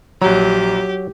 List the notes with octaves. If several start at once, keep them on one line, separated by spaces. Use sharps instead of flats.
A#1 F#3 G4 A#5